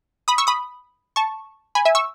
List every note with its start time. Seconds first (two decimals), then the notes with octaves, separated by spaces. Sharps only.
0.28 B5 D#6
0.38 C#6 E6
0.47 B5 D#6
1.16 A5 C#6
1.75 G#5 B5
1.85 E5 G#5
1.95 C#6 E6